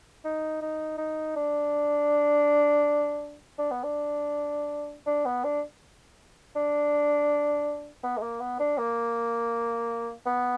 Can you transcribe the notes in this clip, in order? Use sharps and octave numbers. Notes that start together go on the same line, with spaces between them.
D#4
D#4
D#4
D4
D4
B3
D4
D4
B3
D4
D4
B3
G#3
A#3
B3
D4
A#3
B3